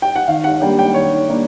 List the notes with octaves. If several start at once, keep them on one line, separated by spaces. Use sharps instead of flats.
G5
F#5
D#3 F5
F#5
G3 A#3 D4 G5
G5
D#3 C#5
G3 A#3 D4